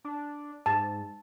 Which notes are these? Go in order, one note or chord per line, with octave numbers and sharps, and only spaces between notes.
D4
G#2 A5